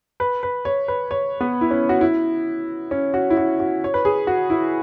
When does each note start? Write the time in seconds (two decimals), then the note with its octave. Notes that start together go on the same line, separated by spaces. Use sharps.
0.20 B4
0.43 B4
0.65 C#5
0.88 B4
1.11 C#5
1.41 B3
1.61 E4
1.71 C#4
1.89 F#4
2.01 E4
2.91 C#4
3.14 F#4
3.30 E4
3.37 F#4
3.60 F#4
3.84 C#5
3.94 B4
4.05 G#4
4.27 F#4
4.50 E4